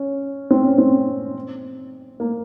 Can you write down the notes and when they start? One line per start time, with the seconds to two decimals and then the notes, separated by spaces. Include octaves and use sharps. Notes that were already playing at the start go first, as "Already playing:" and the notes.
Already playing: C#4
0.51 C4
0.64 C#4
0.78 C4
2.20 A#3